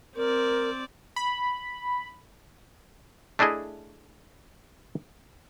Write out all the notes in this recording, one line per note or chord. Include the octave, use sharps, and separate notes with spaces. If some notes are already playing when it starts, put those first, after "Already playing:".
C4 A#4 D5
B5
A3 D4 E4 G#4 D#5